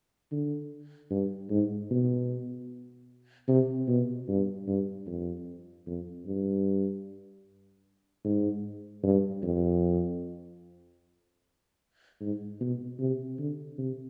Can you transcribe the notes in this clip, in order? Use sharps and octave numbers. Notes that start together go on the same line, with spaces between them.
D3
G2
G#2
B2
C3
B2
G2
G2
F2
F2
G2
G#2
G2
F2
G#2
B2
C3
D3
C3